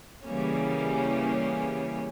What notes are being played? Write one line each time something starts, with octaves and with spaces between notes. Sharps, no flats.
C#3 E3 G3 A#3 C#4